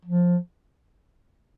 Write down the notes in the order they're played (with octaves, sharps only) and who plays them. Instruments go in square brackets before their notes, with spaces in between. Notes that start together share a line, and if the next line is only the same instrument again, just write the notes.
[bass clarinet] F3